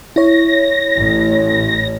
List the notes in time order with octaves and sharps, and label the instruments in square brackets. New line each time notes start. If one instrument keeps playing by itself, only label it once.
[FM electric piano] E4 C#5 [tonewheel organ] A#6
[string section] A1